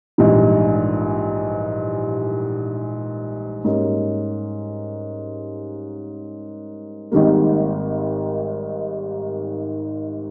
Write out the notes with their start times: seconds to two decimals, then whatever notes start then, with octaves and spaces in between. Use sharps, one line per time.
0.18 A#1 G#2 E3 G3
3.64 G#2 G3 A#3 C#4
7.12 G#1 G#2 D#3 G3 A#3